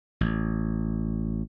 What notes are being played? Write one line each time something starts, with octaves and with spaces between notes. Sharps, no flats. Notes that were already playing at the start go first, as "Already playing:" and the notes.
A1